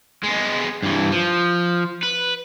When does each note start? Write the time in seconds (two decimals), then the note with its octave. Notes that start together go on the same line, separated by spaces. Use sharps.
0.23 G#3 B3
0.83 G2 E3
1.12 F3
2.03 B4